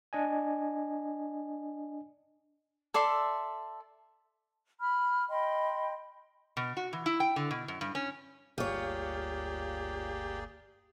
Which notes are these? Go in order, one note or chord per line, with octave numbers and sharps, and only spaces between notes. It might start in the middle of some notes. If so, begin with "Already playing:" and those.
D4 D#5 G#5
A4 D5 E5 C6
B5 F6
D#5 G5 B5 C6
B2
F#4
E3
E4
G5
D3
B2
F#2
G2
C#4
G1 D2 A#3 F4 G4 G#4 C#5 D5